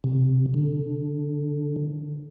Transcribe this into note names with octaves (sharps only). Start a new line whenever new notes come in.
C3
D3